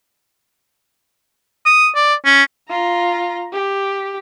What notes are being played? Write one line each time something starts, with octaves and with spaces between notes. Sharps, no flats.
D#6
D5
C#4
F4 A#5
G4